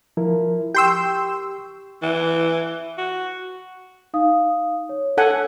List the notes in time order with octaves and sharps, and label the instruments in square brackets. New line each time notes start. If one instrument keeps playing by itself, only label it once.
[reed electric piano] F3 E4 A#4
[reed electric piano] G4 C#6 [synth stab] G5 C6 E6
[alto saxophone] E3
F#4
[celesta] D#4 F5 D#6
C#5
[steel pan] A4 F#5 G#5